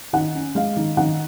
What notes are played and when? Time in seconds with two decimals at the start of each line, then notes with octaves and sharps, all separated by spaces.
0.13 D#3 F#5
0.35 C#4
0.55 G#3 F5
0.76 D#3
0.97 D#3 F#5